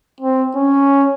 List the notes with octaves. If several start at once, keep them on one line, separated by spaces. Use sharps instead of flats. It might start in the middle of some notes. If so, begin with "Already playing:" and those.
C4
C#4